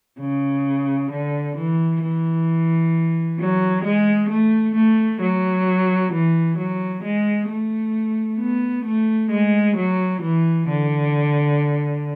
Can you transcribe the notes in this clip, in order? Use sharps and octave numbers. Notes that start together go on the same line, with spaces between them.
C#3
D3
E3
E3
F#3
G#3
A3
A3
F#3
E3
F#3
G#3
A3
B3
A3
G#3
F#3
E3
D3